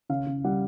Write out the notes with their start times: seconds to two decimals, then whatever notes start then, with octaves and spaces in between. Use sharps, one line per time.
0.09 C#3 F5
0.27 C#3
0.44 G3 F#5